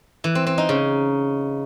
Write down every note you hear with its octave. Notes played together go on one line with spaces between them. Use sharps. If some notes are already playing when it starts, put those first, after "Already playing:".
E3
C4
C4
D#4
C#3